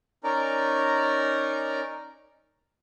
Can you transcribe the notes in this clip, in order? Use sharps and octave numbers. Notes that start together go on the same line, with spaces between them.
C#4 D#4 A#4 D5 A#5